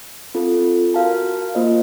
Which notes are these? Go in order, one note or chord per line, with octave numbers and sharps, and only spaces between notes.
C4 F4 A4
F#4 A#4 F5 A5
A#3 F4 C5 D#5